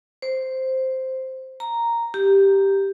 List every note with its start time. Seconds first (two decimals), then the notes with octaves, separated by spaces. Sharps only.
0.22 C5
1.60 A#5
2.14 G4